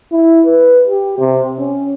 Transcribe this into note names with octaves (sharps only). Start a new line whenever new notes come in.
E4
B4
G4
C3
C#4